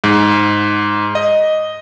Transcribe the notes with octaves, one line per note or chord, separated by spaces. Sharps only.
G#2
D#5